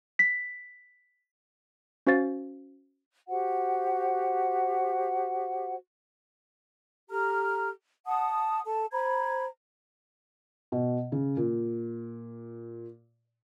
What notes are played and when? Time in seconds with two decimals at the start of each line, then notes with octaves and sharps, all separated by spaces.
0.19 B6
2.07 C#4 F#4 C5 F5 A6
3.28 F#4 G4 C5 F#5
7.09 G4 A4 A#5 F6
8.07 F#5 A5 D#6
8.66 A4 A5
8.92 C5 A#5 B5 G#6
10.72 B2
11.12 C#3
11.37 A#2